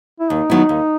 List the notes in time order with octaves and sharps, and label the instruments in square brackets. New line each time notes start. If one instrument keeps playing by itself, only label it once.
[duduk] E4
[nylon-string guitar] D#2 [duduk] D#4
[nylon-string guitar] D#3 F#3 B3 E4
D#2